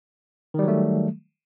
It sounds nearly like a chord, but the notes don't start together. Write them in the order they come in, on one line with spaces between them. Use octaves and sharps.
D#3 G3 F#3 A3